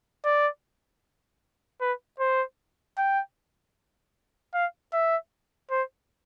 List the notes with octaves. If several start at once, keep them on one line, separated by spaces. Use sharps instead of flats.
D5
B4
C5
G5
F5
E5
C5